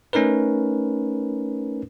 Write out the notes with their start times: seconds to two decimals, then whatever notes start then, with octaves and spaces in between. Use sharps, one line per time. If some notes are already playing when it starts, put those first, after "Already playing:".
0.13 A3 C#4 D#4 A#4 B4